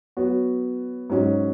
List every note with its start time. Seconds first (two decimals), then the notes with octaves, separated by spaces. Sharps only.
0.17 F#3 B3 F#4 C#5
1.10 G#2 F#3 C#4 F#4